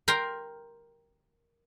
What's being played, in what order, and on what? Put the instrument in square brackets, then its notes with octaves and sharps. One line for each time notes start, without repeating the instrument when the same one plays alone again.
[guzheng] A#4 G5 A#5 C6